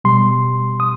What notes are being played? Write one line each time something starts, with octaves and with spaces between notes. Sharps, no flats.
B2 G3 C6
D#6